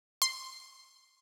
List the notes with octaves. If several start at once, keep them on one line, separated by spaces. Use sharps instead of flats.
C6